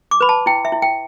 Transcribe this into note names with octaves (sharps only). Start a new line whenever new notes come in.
D6
B4 B5
A5
E4 G5
E5
E4
G5